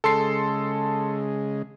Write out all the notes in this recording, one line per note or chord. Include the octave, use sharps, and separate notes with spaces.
C#3 G#3 A4 C6 C7